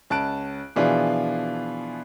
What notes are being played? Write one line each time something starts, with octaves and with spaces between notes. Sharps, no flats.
C#2 A5 F#6 D7
B2 E3 F3 D4 F4 G#4